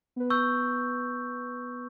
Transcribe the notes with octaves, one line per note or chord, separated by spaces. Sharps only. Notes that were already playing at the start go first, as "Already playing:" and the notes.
B3 B4
C#6 E6 G6